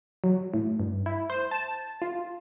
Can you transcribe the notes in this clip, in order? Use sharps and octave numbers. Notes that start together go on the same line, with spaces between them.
F#3
A2
G2
E4
C5
A5
F4